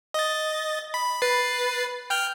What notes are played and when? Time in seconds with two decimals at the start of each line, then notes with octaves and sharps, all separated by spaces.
0.14 D#5 A6
0.94 B5
1.22 B4 A6 C7
2.10 G5 F6 G6